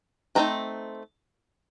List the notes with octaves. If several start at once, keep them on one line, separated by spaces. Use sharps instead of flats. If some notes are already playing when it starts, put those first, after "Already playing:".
E3 A3 C4 D#4 A#5